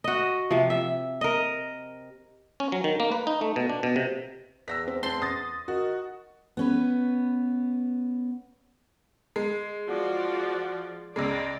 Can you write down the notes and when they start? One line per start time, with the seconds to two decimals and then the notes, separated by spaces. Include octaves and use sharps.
0.04 F#4 D#5
0.51 C3 F3
0.70 E5
1.21 A#4 D#5
2.60 C#4
2.72 F#3
2.84 D#3
3.00 A#3
3.12 B4
3.27 D#4
3.41 A3
3.56 B2
3.70 D4
3.83 B2
3.96 C3
4.68 E2 E6 A#6 B6
4.88 C4
5.03 C4 A5 C6 C7
5.22 D#6 A6 A#6
5.68 D#3 F#4
6.57 B3 C#4 B4
9.36 G#3
9.87 F3 F#4 D5
11.16 C#2 C#3 G#3 D5 D#5